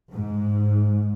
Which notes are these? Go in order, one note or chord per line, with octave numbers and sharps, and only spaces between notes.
G#2